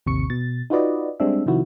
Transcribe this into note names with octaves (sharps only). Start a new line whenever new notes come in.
A1 D#2 C3 C#6 C#7
B2 A6
D#4 F4 F#4 B4 D5 D#5
G3 G#3 C4 D4 E5
C3 D#3 F3 E4 F#4